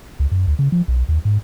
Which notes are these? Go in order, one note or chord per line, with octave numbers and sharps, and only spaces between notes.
C#2
F#2
D2
C#3
F3
B1
D#2
G#2